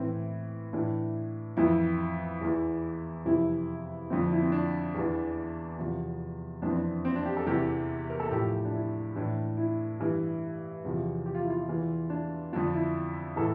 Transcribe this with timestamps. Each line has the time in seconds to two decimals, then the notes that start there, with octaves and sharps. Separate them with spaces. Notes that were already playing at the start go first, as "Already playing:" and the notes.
Already playing: A2 E3 C4
0.73 A2 E3 D4
1.57 F2 E3 E4
2.41 E2 E3
3.25 F2 C3 E3 E4
4.10 F2 D3 F3 C4
4.20 D4
4.31 E4
4.42 C4
4.52 D4
4.94 E2 E3
5.79 E2 C3 F3
6.62 F2 E3 D4
6.70 C4
6.77 D4
7.05 C4
7.16 D4
7.26 G4
7.37 A4
7.46 E2 C3 E3 G4
8.10 A#4
8.20 A4
8.31 A2 F3 G4
8.65 D4
8.74 E4
9.16 A2 E3 D4
9.57 E4
10.00 G2 E3
10.85 E2 C3 F3
11.26 G4
11.35 F4
11.43 E4
11.50 F4
11.68 E2 E3
12.10 D4
12.52 F2 D3 F3 D4
12.74 E4
13.36 A2 E3 A4